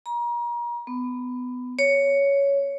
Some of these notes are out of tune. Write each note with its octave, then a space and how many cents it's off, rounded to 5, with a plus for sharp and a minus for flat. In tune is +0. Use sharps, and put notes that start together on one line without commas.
A#5 +35
B3 +20
C#5 +10